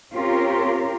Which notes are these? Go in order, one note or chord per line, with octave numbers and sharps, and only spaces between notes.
C4 C#4 F4 G4 A#4 C#5